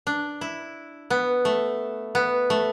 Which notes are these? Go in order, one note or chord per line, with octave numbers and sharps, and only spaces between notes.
D4
E4
B3
A3
B3
A3